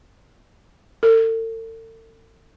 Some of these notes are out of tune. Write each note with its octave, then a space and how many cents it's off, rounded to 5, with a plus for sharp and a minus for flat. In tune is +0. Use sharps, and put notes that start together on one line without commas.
A4 +40